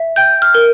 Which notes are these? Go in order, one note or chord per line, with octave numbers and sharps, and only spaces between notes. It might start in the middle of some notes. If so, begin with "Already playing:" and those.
Already playing: E5
G5 G6
F6
A#4